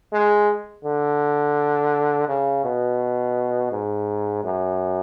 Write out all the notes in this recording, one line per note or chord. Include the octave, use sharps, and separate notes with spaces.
G#3
D3
C#3
B2
G#2
F#2